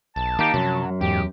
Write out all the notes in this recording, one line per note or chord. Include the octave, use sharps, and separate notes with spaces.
B1 A5
D#3 A#3 D#4 G4
F#2 C3 F3 F#3
E2 G#2 G4